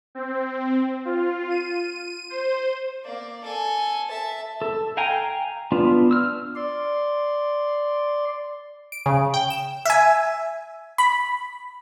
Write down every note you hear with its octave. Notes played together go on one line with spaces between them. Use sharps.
C4
F4
D#7
C5
A#3 D5
A4 G#5
E5 A5
A4
F5 G5 G#5 A#5
B3 D4 F4
E6 F6
D5 C6
D7
C#3
G5
E7
E5 G#5
B5